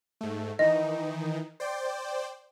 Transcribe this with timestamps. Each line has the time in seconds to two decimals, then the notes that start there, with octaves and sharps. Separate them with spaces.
0.21 G#2 A3
0.59 D#3 E3 D#4 D#5
1.60 C5 D5 G5